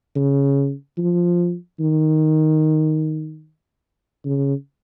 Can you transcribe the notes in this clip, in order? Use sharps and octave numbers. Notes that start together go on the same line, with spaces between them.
C#3
F3
D#3
C#3